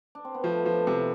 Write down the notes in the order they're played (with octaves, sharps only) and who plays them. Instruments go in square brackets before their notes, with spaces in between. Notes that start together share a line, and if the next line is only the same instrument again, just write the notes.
[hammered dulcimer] D4
C4
B3
[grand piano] F3 [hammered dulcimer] A3
[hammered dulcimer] B3
[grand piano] F3
[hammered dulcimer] D4
[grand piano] C3 [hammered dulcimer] E4